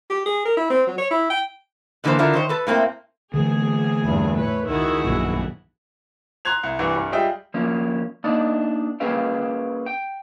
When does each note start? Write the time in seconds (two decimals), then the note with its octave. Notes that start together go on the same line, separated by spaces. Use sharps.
0.10 G4
0.26 G#4
0.45 A#4
0.57 E4
0.70 C4
0.87 F#3
0.98 C#5
1.11 E4
1.30 G5
2.04 G#2 D3 E3 G3 A#3 C5
2.19 D3 D4 E4 F4 A#4
2.34 D#3 C5 C#5
2.49 A4 B4
2.67 A2 A#3 C4 E4
3.34 D3 E3 A3 G#4
4.04 E2 G2
4.36 A2 B4 C#5
4.67 C#2 D#3 E4 F#4 G#4
5.04 A#1 F#2 D#3
6.45 A#5 C6 F#6 G#6 F7
6.63 C2
6.79 C2 G2 E3
6.95 C2 G2
7.12 G3 F4 G#4 D#5 E5 G5
7.54 F3 A#3 C#4
8.24 A#3 D4 D#4 D5
9.00 A#3 C#4 G#4 B4 F5 G5
9.86 G5